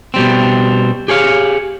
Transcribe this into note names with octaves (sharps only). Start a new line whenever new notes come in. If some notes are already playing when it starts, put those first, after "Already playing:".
B2 G3 C4
G4 G#4 C#5 F5